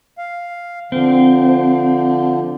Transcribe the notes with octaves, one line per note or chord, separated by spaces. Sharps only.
F5
D3 F3 C4